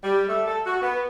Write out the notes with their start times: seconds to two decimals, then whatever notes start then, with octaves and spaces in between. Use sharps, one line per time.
0.03 G3
0.27 A3
0.46 A4
0.65 F#4
0.82 B3